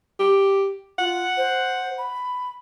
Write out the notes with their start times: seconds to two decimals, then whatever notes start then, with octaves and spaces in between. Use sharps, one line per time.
0.20 G4
0.99 F4 F#5
1.37 C5
1.98 B5